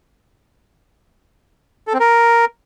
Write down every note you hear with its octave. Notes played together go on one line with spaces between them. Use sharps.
A4
C4
A#4